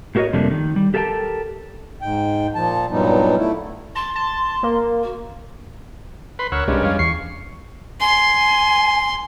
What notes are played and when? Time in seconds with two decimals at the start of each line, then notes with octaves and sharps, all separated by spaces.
0.15 A2 A3 F#4 A#4 C#5 D#5
0.33 F2 C3 G3 A3 A#3 D4
0.51 D#3
0.76 G3
0.94 G4 A4 A#4 F5 G5 A5
2.02 G#2 G5
2.55 A#2 F3 A5
2.91 G2 A#2 F#3 G3 B3 D#4
3.37 A3 E4
3.95 A5 C6
4.15 A5
4.63 A#3
5.03 F#4
6.39 B4 B5 C6
6.52 D2 A#4 C#5 F#5 E6
6.68 C2 G2 G3 G#3 C#4
6.84 F2 F5
6.99 E2 C#6 C7
8.01 G#5 C6